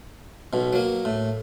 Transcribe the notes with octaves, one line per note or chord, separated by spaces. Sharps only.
B1 B2
F#3 A#3
A2